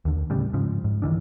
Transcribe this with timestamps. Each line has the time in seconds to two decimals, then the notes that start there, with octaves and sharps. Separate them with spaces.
0.05 D#2 D3
0.30 A2 C#3 G3
0.53 G#2 C#3 F3
0.84 G#2
1.02 G2 D#3 E3 D4